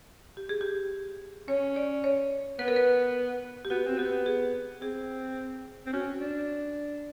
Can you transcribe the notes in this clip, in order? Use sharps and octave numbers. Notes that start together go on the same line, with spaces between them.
G4
G#4
G4
C#4 C#5
D5
C#5
B3 B4
A#4
B4
G4
B3 F#4
C4
B3 G4
G#4
C4 G#4
C4
C#4 F#4
D4